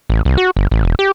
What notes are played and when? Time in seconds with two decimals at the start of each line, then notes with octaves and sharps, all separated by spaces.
0.10 A1
0.25 C2
0.37 F#4
0.56 G1
0.71 A1
0.84 E1
0.99 G4